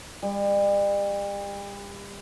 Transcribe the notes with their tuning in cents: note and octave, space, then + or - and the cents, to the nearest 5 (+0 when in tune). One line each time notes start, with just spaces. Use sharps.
G3 +40